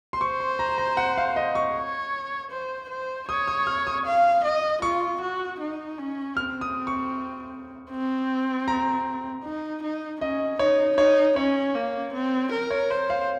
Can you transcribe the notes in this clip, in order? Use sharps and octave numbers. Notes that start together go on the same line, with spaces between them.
C6
C5 C#6
C6
A#5
A#5
F#5
F5
D#5
C#6
C#5
C5
C5
C#5 D#6
D#6
F6
D#6
F5
D#5
F4 C#6
F#4
D#4
C#4
C4 F6
D#6
C#6
C4
A#5
D#4
D#4
C#4 D#5
D#4 C#5
D#4 C#5
C#4 C#5
A#3
C4
A#4
C#5
C5 C#5
F5